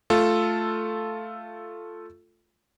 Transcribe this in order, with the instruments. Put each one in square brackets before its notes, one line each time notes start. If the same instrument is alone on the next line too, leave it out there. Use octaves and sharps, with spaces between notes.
[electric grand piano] A3 F4 A4